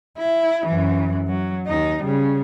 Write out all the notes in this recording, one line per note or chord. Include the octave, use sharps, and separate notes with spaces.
E4
F#2 E3
F#3
D#2 D#4
C#3 G3